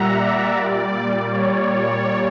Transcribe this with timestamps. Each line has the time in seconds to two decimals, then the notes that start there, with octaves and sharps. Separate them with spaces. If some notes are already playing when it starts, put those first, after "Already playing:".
Already playing: A#2 G3 E5 F#5 A#5
0.18 D5
0.56 A#2 G3
1.32 C#5